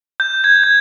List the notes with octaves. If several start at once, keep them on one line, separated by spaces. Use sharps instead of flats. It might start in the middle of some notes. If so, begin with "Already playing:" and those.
G6
G#6
G#6